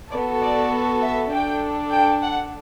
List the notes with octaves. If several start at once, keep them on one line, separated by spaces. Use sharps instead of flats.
B3 F#4 A4 D5
D5
E5
D4 A4 G5
G5
F#5